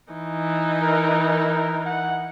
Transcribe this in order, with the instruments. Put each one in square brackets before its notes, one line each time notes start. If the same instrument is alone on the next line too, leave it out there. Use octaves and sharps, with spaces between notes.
[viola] E3 D#4
[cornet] A#4
A#4
F#5